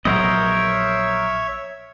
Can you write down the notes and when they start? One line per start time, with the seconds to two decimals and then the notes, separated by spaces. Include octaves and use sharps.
0.05 A#1 F#3 B3 A#4 C5 C#5 D#5 E5